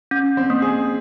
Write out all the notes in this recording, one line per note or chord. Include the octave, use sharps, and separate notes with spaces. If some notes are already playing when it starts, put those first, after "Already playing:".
C#4
C4
A#3
G#4